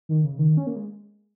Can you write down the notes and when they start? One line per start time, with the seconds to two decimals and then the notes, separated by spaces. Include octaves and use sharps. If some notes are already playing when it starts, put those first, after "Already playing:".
0.09 D#3
0.24 C#3
0.38 D#3
0.57 C#4
0.67 A#3
0.76 G#3